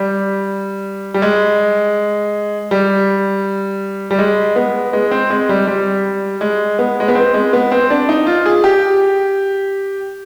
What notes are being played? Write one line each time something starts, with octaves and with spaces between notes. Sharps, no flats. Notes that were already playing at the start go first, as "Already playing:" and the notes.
Already playing: G3
G3
G#3
G3
G3
G#3
B3
G#3
C4
G#3
G3
G3
G#3
B3
G#3
B3
C4
G#3
B3
C4
D4
D#4
F4
G#4
G4